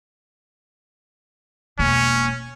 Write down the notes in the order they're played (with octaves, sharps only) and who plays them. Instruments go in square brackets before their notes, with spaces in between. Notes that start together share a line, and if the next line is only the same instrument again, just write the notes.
[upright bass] E1 A#3 [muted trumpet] C#4